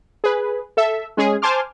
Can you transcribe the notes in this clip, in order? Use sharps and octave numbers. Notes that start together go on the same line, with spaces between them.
G#4 B4
A4 E5
G#3 C#4 G#4
C5 G#5 A5 C6 D6 F6